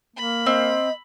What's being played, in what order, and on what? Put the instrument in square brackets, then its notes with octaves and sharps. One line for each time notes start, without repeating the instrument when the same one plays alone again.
[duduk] A#3 [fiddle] B5
[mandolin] C4 [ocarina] D#5